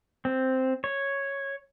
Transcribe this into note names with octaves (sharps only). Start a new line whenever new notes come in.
C4
C#5